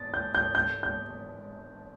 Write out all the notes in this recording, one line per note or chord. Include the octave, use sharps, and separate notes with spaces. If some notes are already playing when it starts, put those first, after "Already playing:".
Already playing: A6
G6
G6
G6
G6